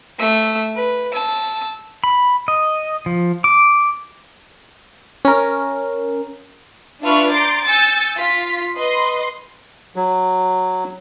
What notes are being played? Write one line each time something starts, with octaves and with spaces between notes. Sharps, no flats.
A3 E6
B4
A5 E6
B5
D#5
F3
D6
C#4 A#4
D4 F4 B4 E5 C#6 F6
A#5 C6 D6 G6 A6
G#5 E6 G6 A6 C#7
F4 B6
B4 D#5 C6
F#3